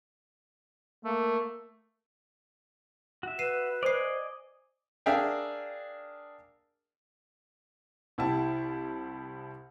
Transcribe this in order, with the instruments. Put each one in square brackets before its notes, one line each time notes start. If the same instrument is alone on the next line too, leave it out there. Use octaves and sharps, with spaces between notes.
[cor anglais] A3 [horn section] A#3
[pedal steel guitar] F#4 E5
[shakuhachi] B4 [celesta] C7 D#7 E7
[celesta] C5 C7 [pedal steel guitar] D5 D#5 G#5
[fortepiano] D4 G#4 A#4 E5 F5 G5
[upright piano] C2 E4 G4 A5